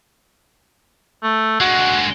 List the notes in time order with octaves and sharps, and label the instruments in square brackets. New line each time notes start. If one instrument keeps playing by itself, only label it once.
[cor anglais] A3
[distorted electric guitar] D3 G#3 [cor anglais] F#4